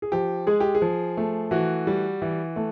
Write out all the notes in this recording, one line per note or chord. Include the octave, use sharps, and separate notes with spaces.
G#4
F3 G4
G#3 G#4
G4
G#4
F3
A3
E3 F#4
G3
E3
A3